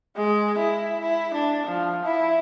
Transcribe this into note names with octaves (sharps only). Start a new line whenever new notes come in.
G#3
E4
E4
D4
F3
E4